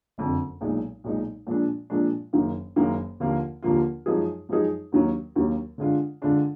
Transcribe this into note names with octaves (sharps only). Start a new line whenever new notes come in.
F#1 F2 D3
B1 A#2 G#3 D#4
B1 A#2 G#3 D#4
A#2 F3 G#3 D4
A#2 F3 G#3 D4
F#1 F#2 D#3 A#3
F#1 F#2 D#3 A#3
D#2 D3 F3 A#3 F4
D#2 D3 F3 A#3 F4
F#2 F3 G#3 D#4 G#4
F#2 F3 G#3 D#4 G#4
D#2 D#3 F#3 A#3
D#2 D#3 F#3 A#3
D3 G#3 D4 F4
D3 G#3 D4 F4